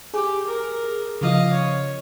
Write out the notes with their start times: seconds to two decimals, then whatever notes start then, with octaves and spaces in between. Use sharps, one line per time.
0.14 G4 G#4
0.47 A#4
1.21 C#3 F3 F4 D#5 F5
1.53 C#5